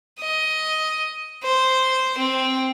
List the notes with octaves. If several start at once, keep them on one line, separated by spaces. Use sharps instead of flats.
D#5
C5
C4